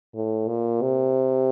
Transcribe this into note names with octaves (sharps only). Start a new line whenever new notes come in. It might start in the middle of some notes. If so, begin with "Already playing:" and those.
A2
A#2
C3